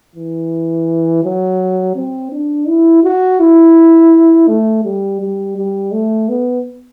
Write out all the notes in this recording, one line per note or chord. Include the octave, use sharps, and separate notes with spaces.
E3
F#3
C4
D4
E4
F#4
E4
A3
G3
G3
G3
A3
B3